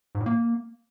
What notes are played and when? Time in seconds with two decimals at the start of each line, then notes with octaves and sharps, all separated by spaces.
0.15 G#2
0.20 A2
0.26 A#3